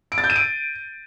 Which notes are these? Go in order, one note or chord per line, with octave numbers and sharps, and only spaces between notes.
D7
A6
G6
D#7
D7